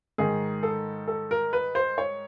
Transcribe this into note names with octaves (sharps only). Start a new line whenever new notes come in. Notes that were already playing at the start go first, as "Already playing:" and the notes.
G#2 D#3 G#4
A4
A4
A#4
B4
C5
C#5